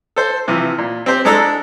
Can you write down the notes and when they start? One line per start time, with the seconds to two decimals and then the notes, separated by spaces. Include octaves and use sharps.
0.16 A4 C5
0.48 C3 E3 F3
0.78 A#2
1.06 C4 G4 C5
1.25 G#3 D4 A4 A#5 E6